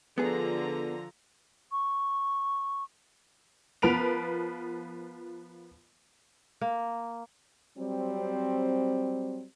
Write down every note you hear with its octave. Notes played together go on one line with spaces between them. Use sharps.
D3 F3 B3 G#4 A#5
C#6
F3 B3 A#4 B4 D7 F7
A#3
F#3 G3 C4